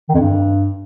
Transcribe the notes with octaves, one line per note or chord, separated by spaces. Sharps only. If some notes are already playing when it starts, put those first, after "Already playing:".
D#3
F2
G2